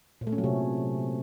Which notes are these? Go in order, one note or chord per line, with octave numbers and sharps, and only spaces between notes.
A#2
A3
C#4
F#3
C3